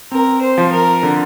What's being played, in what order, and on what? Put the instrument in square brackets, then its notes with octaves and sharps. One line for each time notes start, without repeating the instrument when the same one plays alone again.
[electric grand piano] C4 [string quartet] A#4
[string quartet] C5
[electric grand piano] F3
[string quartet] A#4
[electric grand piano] D3